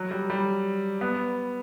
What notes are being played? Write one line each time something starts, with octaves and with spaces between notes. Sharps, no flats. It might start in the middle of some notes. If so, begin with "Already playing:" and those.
Already playing: F#3
G3
G3
B3